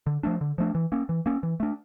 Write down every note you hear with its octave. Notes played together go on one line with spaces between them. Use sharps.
D3
F3 A3 D4
D3
F3 A3 D4
E3
A#3 C#4
E3
A#3 C#4
E3
A3 D4